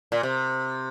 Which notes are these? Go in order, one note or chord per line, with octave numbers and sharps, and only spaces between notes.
A#2
C3